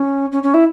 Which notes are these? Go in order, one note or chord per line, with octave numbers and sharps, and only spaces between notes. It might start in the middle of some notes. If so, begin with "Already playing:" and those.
Already playing: C#4
C#4
C#4
E4